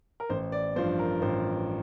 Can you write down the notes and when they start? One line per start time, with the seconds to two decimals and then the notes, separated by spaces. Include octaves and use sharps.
0.20 A#4
0.29 A1 C5
0.52 D5
0.76 G2 F3 C5
0.99 A#4
1.22 A1 C5